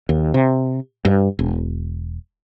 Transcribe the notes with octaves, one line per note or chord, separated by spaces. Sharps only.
D#2
C3
G2
E1